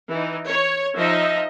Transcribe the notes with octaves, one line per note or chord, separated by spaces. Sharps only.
E3 D#4
C#5
F3 D#4 D#5 E5